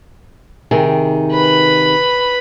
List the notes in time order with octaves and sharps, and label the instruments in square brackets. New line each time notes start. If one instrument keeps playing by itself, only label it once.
[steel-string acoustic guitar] C3 D#3 G#4
[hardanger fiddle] B4 B5